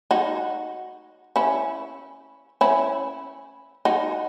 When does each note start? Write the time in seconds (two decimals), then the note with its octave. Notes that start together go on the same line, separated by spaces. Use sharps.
0.11 D#4 F#4
1.36 C#4 E4
2.61 C#4 E4
3.85 D#4 F#4